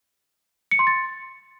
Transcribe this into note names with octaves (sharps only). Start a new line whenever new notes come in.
C#7
C6
A6